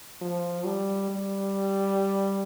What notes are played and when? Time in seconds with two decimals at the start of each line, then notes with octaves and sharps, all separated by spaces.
0.22 F3
0.66 G3
1.10 G3